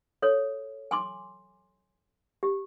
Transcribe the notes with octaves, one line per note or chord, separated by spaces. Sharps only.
A4 C#5
G#5 C6 D6
G4